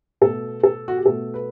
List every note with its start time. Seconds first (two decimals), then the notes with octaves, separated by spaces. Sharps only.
0.21 B2 A3 A4
0.63 A4
0.88 F#4
0.97 G4
1.06 B2 A3 A4
1.34 B4